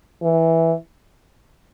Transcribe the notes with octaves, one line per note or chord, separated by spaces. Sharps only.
E3